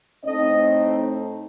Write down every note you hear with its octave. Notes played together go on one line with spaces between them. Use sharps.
A2 A3 C4 D#4 D#5